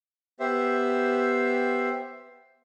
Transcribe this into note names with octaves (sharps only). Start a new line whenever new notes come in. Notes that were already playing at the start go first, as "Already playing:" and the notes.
B3 G4 C5 E5